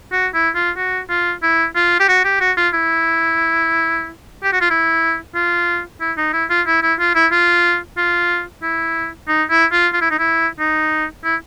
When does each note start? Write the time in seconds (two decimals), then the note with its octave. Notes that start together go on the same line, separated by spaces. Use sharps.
0.12 F#4
0.34 E4
0.55 F4
0.77 F#4
1.10 F4
1.43 E4
1.76 F4
2.00 G4
2.08 F#4
2.24 G4
2.40 F#4
2.57 F4
2.73 E4
4.43 G4
4.52 F#4
4.61 F4
4.70 E4
5.35 F4
6.01 E4
6.17 D#4
6.33 E4
6.50 F4
6.67 E4
6.82 E4
6.99 F4
7.15 E4
7.31 F4
7.97 F4
8.63 E4
9.28 D#4
9.50 E4
9.72 F4
9.93 F4
10.01 E4
10.11 D#4
10.19 E4
10.59 D#4
11.24 E4